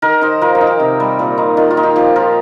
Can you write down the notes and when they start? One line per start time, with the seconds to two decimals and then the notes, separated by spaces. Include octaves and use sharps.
0.02 D#3 A#4
0.21 D#4 C5
0.41 F3 A#4
0.55 G4
0.61 D#4
0.67 G4
0.80 C3
1.00 G3
1.19 A#2
1.38 D#4
1.57 D#3 F4
1.70 F4
1.77 D#4
1.83 G4
1.96 F3 G4
2.16 F3 A#4